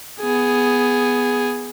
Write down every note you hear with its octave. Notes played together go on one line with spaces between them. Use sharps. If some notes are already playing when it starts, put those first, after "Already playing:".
B3 G#4